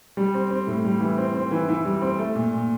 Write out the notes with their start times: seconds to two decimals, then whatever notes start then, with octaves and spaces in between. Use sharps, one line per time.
0.17 G3
0.34 C4
0.50 C4
0.67 A2
0.85 G3
1.00 E3
1.18 C4
1.34 C4
1.51 E3
1.69 E3
1.85 G3
2.02 C4
2.19 A3
2.35 A#2
2.53 A#2